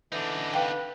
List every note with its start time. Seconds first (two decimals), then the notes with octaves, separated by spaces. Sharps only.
0.12 D3 E3 D4 D#4
0.54 B4 F5 G5